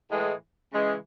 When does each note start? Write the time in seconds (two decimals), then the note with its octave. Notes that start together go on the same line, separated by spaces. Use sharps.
0.10 A2 E3 G#3
0.72 C#3 E3 G#3